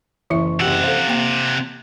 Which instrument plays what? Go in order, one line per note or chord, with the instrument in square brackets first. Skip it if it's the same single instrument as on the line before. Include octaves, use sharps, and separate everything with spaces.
[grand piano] F#1 C#6 [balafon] E3 E4 E5
[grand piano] F#1 G4 E6 [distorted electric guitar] C3 F#5
[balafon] A4 C5 [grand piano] F5
[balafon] A#3 G5